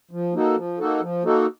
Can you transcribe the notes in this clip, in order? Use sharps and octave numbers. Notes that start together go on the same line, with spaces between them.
F3
A#3 D#4 F#4 A4
F3
A#3 D#4 F#4 A4
F3
A#3 D#4 F#4 A4